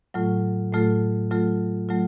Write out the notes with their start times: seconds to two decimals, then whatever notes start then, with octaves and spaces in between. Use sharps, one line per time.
0.14 A2 F#3 A3 F4 A4
0.73 A2 F#3 A3 F4 A4
1.31 F#3 A3 F4 A4
1.88 F#3 A3 F4 A4